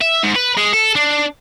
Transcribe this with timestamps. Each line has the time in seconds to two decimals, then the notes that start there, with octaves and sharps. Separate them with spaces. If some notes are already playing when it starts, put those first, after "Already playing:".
0.01 E5
0.23 G#2
0.35 B4
0.57 G#3
0.73 A4
0.96 D4